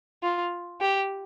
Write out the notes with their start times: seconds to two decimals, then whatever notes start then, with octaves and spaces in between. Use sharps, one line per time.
0.23 F4
0.81 G4